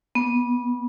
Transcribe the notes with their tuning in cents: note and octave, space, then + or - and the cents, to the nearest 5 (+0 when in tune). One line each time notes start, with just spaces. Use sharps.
B3 -20